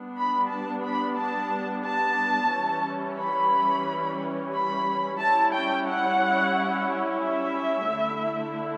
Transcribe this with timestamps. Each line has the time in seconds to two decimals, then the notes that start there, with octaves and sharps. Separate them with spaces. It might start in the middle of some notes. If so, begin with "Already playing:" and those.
Already playing: G3 B3 D4
0.18 B5
0.51 A5
0.85 B5
1.18 A5
1.85 A5
2.53 E3 G3 C#4
3.19 B5
4.54 B5
5.20 G3 C#4 E4 A5
5.54 G5
5.88 F#5
7.21 E5
7.88 D3 A3 E4